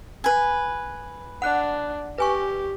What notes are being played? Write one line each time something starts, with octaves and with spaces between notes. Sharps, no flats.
B4 G#5
D4 F#5 F#6
G4 B4 G#5 C#6